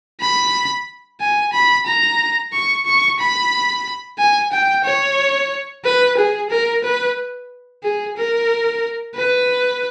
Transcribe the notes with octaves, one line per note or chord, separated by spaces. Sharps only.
B5
G#5
B5
A#5
C#6
C#6
B5
G#5
G5
C#5
B4
G#4
A#4
B4
G#4
A#4
B4